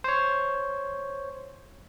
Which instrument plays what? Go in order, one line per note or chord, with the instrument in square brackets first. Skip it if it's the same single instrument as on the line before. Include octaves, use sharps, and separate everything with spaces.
[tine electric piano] C5 C#5